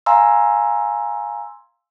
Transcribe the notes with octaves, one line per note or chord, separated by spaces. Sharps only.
F5 G#5 A#5 C6 E6